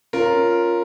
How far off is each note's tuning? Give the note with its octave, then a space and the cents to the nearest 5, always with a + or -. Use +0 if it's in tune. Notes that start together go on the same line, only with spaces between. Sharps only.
C#4 +0 F4 +0 A#4 +0